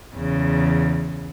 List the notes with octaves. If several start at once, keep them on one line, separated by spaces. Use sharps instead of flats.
E2 C#3